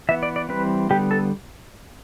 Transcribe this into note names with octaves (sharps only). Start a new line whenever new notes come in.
E3 B3 E5
D5
D5
E3 G3 C4 B4
D3 G3 B3 G4
A4